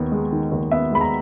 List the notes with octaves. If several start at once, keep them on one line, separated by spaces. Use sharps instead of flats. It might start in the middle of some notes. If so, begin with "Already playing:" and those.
Already playing: D#2 D#3 B3
G#3
D#3
D#2
B3 E5
G#3 B5
A#5